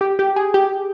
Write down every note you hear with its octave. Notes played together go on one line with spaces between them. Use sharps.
G4
G4
G#4
G4